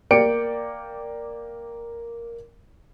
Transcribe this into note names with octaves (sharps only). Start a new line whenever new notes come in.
A#3 D5 G5 C#7 D7